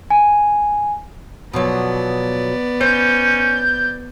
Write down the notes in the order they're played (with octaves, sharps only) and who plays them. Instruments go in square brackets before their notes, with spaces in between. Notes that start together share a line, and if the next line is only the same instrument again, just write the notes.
[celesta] G#5
[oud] B2 F3 F#3 [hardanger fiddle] B3 D5
[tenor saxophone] C#4 [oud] C5 [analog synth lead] G6